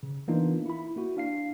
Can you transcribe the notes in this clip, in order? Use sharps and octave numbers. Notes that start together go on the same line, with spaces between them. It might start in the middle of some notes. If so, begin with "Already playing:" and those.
C#3
E3 A#3 B3 D4 D#4 F4
E4 B5
A#3 E4 F#4
D4 F5 C7